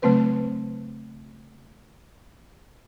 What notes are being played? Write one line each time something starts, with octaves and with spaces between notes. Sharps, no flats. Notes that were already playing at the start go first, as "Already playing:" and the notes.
C#3 F#3 A3 C4 B4 C5